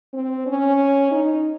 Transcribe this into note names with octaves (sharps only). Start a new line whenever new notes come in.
C4
C#4
D#4